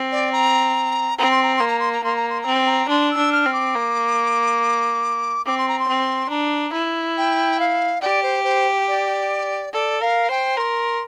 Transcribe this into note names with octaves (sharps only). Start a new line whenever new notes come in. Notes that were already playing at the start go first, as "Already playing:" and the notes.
Already playing: C4
D5
A#5
C4 A#5
C6
A#5
A#3 C6
A#5
C6
A#5
A#3 C6
A#5
C6
A#5
C4
C6
A#5
D4 C6
E6
D4
F6
C4
D6
A#3
C4 D6
C6
A#5
C6
C4
D4 A#5
E4
G5
F5
G4 D5
C5
C5
D5
A4 D5
A#4 F5
C5 G5
A#4 C6